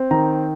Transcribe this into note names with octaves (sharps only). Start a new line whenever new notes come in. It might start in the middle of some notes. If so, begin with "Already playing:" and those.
Already playing: C4
D#3 A#5